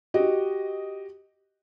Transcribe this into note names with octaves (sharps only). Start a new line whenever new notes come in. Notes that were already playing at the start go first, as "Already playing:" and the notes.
F#4 G4 D#5